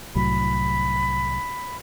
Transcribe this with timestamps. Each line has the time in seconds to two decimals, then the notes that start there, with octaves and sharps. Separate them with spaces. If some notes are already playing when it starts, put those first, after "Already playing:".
0.15 C2 A2 F#3 B5